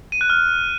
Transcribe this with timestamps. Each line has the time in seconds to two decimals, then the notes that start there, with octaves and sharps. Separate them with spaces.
0.12 D#7
0.21 F#6
0.30 F6